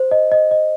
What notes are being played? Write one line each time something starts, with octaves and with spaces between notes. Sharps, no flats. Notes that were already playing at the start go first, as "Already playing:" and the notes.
Already playing: C5
D#5
D#5
D#5